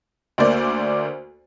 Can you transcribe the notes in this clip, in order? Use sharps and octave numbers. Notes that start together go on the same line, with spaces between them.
D2 A#3 C5 D5